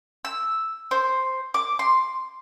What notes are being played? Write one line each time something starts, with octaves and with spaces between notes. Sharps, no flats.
E6
C5
D6
C6